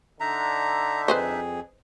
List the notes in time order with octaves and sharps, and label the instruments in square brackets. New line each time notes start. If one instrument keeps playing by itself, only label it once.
[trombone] D3 [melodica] D4 D#4 E5 [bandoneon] A#5
[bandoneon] F2 G#4 [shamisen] B4 C5 D#5